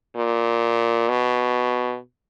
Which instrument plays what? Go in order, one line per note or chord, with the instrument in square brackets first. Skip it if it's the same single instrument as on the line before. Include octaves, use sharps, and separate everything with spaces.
[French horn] A#2
B2